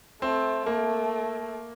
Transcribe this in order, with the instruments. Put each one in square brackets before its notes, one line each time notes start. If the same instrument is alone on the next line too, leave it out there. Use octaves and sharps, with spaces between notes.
[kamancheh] A3 [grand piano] C4
[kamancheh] A3 [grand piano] A#3